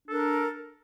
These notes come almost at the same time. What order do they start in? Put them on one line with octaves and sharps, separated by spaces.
D4 A4 A#4